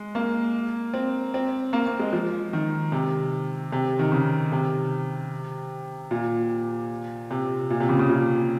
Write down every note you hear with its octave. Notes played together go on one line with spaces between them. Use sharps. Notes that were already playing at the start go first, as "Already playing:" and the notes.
Already playing: G#3
A#3
C4
C4
A#3
A#3
G#3
F3
D#3
C3
C3
D#3
C#3
C3
A#2
C3
A#2
C3
C#3
C#3
A#2